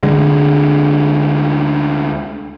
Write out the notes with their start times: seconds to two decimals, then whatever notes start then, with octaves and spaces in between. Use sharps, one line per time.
0.03 D2 D3 G#3